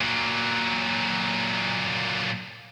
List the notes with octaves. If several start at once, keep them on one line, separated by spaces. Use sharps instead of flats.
A#2 F#3